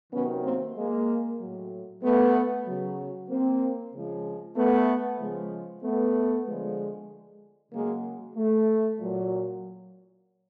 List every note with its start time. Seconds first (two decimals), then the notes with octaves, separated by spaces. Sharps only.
0.13 C3 D#3 F#3 B3 C#4
0.44 A#3 C4
0.76 G#3 A#3
1.40 A2 F#3
2.03 A3 B3
2.66 C#3 F#3
3.29 A#3 C4
3.92 C#3 F3 G#3
4.56 A3 B3
5.20 C#3 F3 G#3
5.83 A3 B3
6.46 D3 F3 G#3
7.72 C#3 F#3 G#3 A#3
8.36 A3
8.99 A#2 F#3